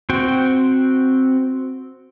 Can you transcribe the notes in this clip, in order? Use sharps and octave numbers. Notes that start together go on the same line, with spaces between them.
C4 F#4 G5